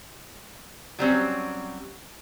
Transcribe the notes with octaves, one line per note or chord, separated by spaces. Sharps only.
F#3 G3 C4 C#4